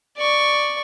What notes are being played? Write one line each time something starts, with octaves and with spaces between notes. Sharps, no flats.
D5 C#6